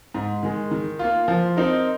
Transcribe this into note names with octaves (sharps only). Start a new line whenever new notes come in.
G#2
D#3 G#3
D#3
A#3 F4
F3
C4 D#4 A#4